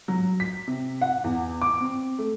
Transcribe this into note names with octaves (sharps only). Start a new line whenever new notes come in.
F#3
B6
C3
F#5
E2
D6
C4
A3